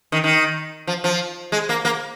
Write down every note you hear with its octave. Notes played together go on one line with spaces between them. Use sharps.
D#3
D#3
F3
F3
G#3
A#3
A#3